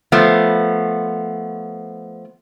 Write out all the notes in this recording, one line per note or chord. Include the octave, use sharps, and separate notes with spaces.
F3 A3 B3